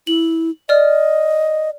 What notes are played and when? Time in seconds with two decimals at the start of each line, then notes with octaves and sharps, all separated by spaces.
0.07 E4 F#7
0.69 D5 D#5 F6